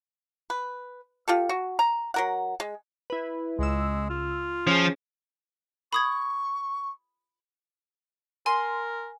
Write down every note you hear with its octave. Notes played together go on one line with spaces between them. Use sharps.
B4
F4 G4 A4
F#4
A#5
F#3 A#4 F#5
G#3
E4 B4
C#2 G#3 E6
F4
F3 C#4 G#4
B5 C#6 D#6 G#6
A#4 G#5 C6